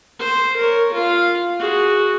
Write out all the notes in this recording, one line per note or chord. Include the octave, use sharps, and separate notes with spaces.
C5
A#4 C#5
F4 F5
F#4 G#4